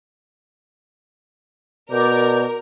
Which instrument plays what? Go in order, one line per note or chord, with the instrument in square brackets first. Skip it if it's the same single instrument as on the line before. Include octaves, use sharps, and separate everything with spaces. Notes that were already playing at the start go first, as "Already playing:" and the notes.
[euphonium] B2 [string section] A#4 [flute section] D5 D6 G6